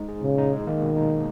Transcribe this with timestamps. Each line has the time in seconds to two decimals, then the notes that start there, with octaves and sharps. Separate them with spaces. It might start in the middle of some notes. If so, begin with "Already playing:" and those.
Already playing: G#3 D#4
0.09 G#4
0.23 A#2 C#3
0.38 D#4
0.53 G#3
0.67 D#3 A#3
0.82 B2
0.96 D#4